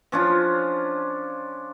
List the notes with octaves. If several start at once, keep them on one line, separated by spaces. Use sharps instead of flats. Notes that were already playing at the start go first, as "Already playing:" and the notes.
F3 C#4 D4 F4